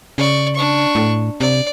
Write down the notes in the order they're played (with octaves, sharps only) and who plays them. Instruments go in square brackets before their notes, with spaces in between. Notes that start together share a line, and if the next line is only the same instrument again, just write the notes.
[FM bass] C#3 [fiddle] D5 C#6
[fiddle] D4 C#6
[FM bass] A2
[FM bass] C3 [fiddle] D5